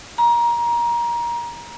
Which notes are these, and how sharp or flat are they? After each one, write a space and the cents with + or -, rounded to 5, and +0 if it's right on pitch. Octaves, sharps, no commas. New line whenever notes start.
A#5 +20